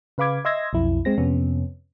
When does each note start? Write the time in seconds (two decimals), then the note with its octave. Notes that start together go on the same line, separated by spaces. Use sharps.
0.18 C#3 B4 F5 B5 D6 G#6
0.45 D#5 E5 C6 E6 G#6 A#6
0.73 B1 F2 E4
1.05 G#3 C4 A#6
1.18 F2 C3 B3 C#4